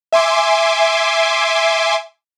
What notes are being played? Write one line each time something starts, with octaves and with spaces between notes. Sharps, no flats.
E5 G#5 C6 D6